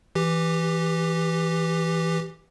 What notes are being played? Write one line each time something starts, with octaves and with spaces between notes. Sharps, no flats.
E3 G4